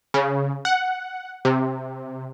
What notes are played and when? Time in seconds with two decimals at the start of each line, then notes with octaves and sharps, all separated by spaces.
0.14 C#3
0.65 F#5
1.45 C3